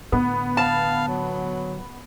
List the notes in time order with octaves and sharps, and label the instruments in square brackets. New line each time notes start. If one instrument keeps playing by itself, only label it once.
[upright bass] A2 D3 [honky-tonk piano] B3
[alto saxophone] F5 [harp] A5
[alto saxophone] F#3